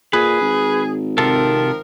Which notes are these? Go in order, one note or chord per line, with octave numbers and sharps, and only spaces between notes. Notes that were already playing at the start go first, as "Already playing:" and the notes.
A#2 G#4 B4
G#1
C3 D#3 F3 F4 A4 A#4